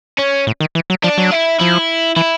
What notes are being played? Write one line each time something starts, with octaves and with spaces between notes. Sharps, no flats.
C#4
A2
D#3
E3
F#3
F3 D4
F#3
E4
F3 E4
E3 E4